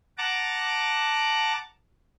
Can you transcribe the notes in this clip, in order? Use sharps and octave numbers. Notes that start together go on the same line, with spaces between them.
F#5 A5 A#5 D6